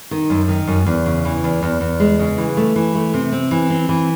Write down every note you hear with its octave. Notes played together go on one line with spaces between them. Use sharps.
D#3
F#2
D#3
F#2
E2
C#3
E3
E2
E2
E2
G#3
C#3
E3
A3
E3
A3
C3
C4
E3
C4
E3